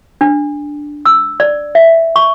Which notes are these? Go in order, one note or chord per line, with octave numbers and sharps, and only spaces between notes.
D4
E6
D5
E5
C#6